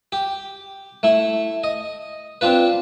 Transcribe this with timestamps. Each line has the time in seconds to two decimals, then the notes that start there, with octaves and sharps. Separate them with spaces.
0.12 G4
1.03 A3 E4
1.64 D#5
2.41 C4 D4 F4 B4